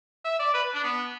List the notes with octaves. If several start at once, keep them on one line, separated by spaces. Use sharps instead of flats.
E5
D5
B4
D4
B3